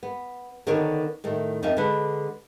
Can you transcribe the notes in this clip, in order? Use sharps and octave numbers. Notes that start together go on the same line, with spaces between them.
B3
D3 D#3 B3 D4 A#4 C#5
A2 D#3 A3
F2 D#4 A#4 E5 F5
D3 G#3 B4